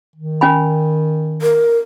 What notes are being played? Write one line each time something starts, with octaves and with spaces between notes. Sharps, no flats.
D#3
C#4 G#5 B5
A#4